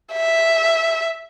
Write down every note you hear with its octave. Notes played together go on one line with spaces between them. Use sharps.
E5